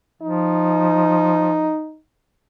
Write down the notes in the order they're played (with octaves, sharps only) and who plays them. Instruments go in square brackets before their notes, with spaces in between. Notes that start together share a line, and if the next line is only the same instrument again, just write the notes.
[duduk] F3 [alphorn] D#4